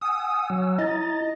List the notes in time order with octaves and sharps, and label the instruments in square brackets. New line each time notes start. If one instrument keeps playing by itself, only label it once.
[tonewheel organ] F#5 G#5 E6 [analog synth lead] D#6
[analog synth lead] F#3
[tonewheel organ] E4 A#5 A6 [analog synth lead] D#5